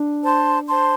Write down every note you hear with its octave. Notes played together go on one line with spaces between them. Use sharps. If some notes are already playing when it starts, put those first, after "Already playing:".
Already playing: D4
C5 A5 C6
C5 A5 C6